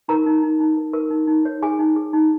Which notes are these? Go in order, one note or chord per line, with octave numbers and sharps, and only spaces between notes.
D#4 A#4 A#5
D#4
D#4
D#4
A#4
A#4
D#4
D#4
C#5
G#4 G#5
D#4
G#4
D#4